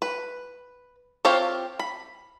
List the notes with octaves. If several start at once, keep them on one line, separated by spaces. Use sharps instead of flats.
B4
C4 F4 G4 C#5 F5
B5